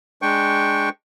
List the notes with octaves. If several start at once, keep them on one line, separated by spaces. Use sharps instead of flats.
G#3 D4 G5 C#6